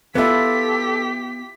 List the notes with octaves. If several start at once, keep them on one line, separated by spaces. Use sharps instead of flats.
B3 E4 F4 G4 A4 B6